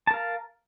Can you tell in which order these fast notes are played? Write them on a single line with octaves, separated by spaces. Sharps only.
A5 A#4 F5